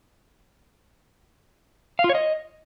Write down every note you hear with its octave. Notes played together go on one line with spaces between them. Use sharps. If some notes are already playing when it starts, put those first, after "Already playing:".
F5
F4
C#5
D#5